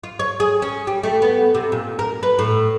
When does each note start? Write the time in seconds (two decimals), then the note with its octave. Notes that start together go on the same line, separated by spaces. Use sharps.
0.04 F4
0.19 C#5
0.40 G#4
0.62 C#4
0.87 G3
1.03 A3
1.22 B3
1.55 C3
1.72 A#2
1.99 A#4
2.23 B4
2.39 A2